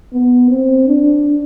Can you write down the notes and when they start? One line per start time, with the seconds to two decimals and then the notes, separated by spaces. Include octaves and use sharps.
0.14 B3
0.50 C4
0.88 D4